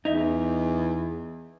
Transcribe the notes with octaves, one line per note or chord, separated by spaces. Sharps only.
E2 D#4 E5